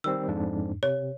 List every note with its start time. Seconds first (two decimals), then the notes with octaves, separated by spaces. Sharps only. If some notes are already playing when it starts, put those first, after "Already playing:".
0.04 D#3 G3 C4 E6
0.28 F2 G#2 D4
0.83 C3 C#5